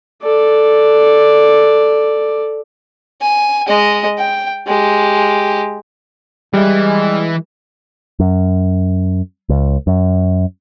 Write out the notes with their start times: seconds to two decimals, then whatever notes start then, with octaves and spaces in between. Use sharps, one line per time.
0.23 A4 D5
3.22 G#5
3.67 G#3 D#5
4.18 G5
4.67 G#3 G4
6.53 E3 G3 G#3
8.20 F#2
9.49 C#2
9.87 F#2